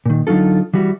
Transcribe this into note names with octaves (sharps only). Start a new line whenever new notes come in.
A#2 D#3
D3 F#3 D#4 F4 A4
E3 G3 F#4